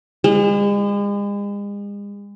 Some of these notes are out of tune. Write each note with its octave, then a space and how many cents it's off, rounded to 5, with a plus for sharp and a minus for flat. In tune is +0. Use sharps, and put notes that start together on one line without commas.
G#3 -40